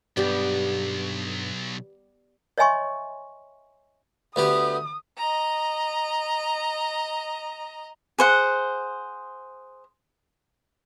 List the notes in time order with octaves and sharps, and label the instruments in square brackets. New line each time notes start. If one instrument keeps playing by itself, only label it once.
[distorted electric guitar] B1 [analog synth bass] G2 [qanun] G3 B3 G4
[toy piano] C#5 D#5 E5 G#5 C6 C#6
[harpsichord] D2 B3 G4 [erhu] D#6
[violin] D#5 A#5
[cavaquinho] G#4 C5 F#5